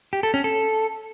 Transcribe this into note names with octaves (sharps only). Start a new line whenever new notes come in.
G4
A4
C#4
A4